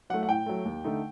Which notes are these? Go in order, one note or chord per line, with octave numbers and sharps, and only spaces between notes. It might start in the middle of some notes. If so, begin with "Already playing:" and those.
F#3 A3 F#5
F#5
A2 G5
F#3 A3
D#2
D3 A3 D#4